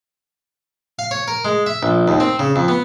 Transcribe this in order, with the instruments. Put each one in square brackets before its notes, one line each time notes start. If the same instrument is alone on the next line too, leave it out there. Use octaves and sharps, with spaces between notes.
[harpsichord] F5
C#5
A#4
G#3
E5
A#1
D#2
C4
C#3
F2
B3